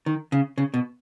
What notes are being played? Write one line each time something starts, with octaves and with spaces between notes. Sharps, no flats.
D#3
C#3
C#3
B2